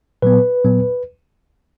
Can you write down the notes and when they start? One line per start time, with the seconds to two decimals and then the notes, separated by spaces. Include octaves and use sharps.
0.22 A#2 F#3 B3 B4
0.64 A#2 F#3 B3